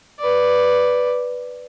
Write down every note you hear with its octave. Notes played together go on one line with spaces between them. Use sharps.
B4 D5